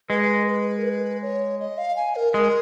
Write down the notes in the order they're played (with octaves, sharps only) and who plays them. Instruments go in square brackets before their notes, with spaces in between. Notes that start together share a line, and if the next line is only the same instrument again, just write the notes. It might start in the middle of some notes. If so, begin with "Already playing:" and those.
[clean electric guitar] G#3 [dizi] B4
[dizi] B4
A#4
B4
C#5
D#5
F5
G#5
A#4
[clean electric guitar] G#3 [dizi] A#4